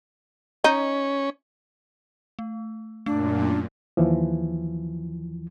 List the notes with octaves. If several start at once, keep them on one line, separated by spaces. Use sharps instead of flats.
C#4 D#4
A3
F#2 A#2 A3 D4
D#2 E3 F3